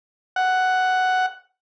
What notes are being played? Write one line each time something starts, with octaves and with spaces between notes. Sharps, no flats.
F#5